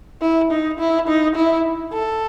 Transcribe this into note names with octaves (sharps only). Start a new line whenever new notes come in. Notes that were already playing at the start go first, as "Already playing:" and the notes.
E4
D#4
E4
D#4
E4
A4